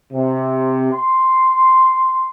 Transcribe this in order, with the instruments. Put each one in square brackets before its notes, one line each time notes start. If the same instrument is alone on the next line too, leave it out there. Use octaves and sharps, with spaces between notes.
[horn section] C3
C6